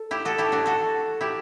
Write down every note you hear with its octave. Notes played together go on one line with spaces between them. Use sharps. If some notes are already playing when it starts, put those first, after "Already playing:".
Already playing: A4
E4 G4
F#4 A4
E4 G4
D4 F#4
F#4 A4
E4 G4